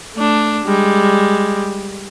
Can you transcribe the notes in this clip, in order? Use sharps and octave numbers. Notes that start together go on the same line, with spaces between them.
A3 D4
G3 G#3